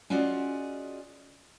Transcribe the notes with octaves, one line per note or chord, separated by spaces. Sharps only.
C#4 F4 F#4 G#4 D5 D#5